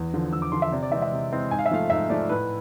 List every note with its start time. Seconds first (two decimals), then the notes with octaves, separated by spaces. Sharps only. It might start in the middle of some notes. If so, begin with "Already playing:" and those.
Already playing: E2
0.14 D3 F3
0.33 E2 E6
0.42 D6
0.52 D3 F3 C6
0.62 E5
0.72 C3 D5
0.83 D5
0.91 E3 G#3 C4 E5
1.02 E5
1.12 C3
1.32 E3 G#3 C4
1.51 G#2 G#5
1.59 F5
1.66 E5
1.71 F3 A3 F5
1.90 G#2 E5
2.09 F3 A3 D5
2.29 A2 B4